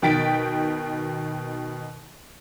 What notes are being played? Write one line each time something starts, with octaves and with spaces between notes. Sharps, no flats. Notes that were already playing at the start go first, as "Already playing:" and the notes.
B2 D#3 G5 A6 B6 D7